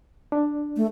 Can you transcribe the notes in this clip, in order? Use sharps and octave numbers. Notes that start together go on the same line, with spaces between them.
D4
A3